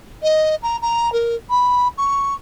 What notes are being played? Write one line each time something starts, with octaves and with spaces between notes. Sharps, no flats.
D#5
A#5
A#5
A#4
B5
C#6